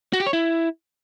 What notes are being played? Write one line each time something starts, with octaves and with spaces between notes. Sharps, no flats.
F#4
G4
C#5
E4